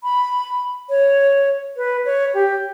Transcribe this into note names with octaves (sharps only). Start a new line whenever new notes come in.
B5
C#5
B4
C#5
G4